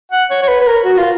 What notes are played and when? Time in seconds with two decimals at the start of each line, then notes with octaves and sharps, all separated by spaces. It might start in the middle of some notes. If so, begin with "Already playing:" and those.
0.12 F#5
0.30 C#5
0.43 C#5
0.48 B4
0.60 B4
0.67 A#4
0.85 F#4
0.98 F4